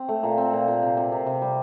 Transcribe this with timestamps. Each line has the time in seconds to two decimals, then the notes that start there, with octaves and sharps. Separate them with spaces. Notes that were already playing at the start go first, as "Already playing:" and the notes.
Already playing: C4
0.09 A3
0.23 A#2
0.38 C4
0.53 A#2
0.68 A#2
0.82 C3
0.97 C3
1.12 C3
1.26 C3
1.41 G3